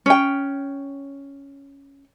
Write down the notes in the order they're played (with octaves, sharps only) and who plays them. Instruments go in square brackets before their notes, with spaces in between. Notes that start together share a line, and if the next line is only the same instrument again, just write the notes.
[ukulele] C#4 G5